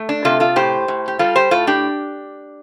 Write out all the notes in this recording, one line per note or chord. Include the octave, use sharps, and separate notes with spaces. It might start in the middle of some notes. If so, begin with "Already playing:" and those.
Already playing: A3
D4
C3 F4 A4
F4 A4
A2 G4 C5
A2
G4
G3 F4 A4
G4 C5
A2 F4 A4
D4 G4